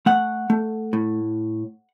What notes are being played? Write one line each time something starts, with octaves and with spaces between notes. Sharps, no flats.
A3 F#5
A3
A2